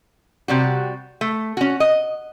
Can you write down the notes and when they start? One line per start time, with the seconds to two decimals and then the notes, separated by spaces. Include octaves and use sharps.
0.48 C3 G3 F#4
1.21 A3
1.57 C#4 F#4
1.80 D#5